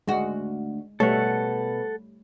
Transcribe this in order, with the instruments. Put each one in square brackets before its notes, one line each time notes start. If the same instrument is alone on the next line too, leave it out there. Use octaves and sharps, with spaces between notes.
[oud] D2 F#4 [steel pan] G#3
[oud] B2 [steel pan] G3 A3 C#5 [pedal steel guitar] A4 F#5